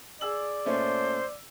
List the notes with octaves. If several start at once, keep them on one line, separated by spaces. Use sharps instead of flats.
G#4 D5 E6 F#7
A#2 A3 C#4 C5